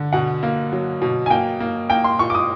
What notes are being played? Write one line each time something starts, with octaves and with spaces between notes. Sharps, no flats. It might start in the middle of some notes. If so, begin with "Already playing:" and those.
Already playing: D3
B2 F#5
A#3
F#3
B2
G#5
A#3 G5
A#3
A#3 G5
C6
A#2 C#6
D6
D#6